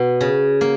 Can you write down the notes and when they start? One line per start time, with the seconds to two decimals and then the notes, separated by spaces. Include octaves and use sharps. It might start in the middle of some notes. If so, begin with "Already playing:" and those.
Already playing: B2
0.21 C#3
0.61 A#3